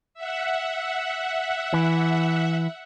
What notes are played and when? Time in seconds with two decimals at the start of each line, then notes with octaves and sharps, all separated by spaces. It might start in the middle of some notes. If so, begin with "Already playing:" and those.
0.14 E5 F#5
1.73 E3